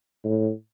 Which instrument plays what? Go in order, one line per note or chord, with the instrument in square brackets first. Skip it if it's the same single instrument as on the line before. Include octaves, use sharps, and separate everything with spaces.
[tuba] A2